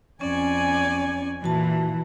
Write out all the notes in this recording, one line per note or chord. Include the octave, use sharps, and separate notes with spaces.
F2 C#4 D5 G#5 C#6
A#2 E3 F#4 A5